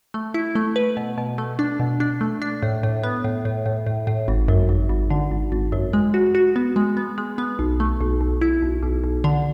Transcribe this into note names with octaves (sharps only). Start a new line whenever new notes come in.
A3
E4
A3
B4
B2
B2
A3
D4
B2
D4
A3
D4
A2
A2
B3
A2
A2
A2
A2
A2
G#1
F#2
G#1
G#1
D3
G#1
G#1
F#2
G#3
F#4
F#4
B3
G#3
B3
G#3
B3
B1
A3
B1
B1
E4
B1
B1
B1
D3